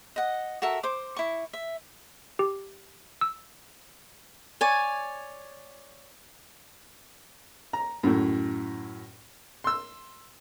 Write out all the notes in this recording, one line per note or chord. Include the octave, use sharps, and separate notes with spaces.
D#5 F#5
F#4 A4 A#4 E5
C5 D6
E4 C#6
E5
G4
E6
C#5 D5 G#5
A#5
F#2 A2
C6 E6